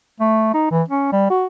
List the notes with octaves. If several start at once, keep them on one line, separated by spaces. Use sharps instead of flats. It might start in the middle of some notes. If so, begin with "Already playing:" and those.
A3
D#4
E3
C#4
G3
F#4